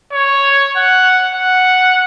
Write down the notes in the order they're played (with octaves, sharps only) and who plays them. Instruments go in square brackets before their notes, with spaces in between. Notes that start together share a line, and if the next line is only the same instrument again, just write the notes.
[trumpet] C#5
F#5
F#5